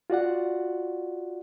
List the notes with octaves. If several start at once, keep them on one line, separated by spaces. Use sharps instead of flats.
F4 F#4 D5 F#5